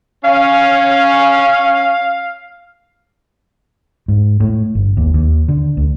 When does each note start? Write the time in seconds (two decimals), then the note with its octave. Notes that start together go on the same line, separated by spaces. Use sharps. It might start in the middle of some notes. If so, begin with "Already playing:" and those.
0.24 C#4 F5
4.08 G#2
4.40 A2
4.75 G1
4.97 D#2
5.14 D#2
5.48 D3
5.77 D2